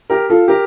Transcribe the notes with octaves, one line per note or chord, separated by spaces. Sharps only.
G4 A#4
F4 A4
G4 A#4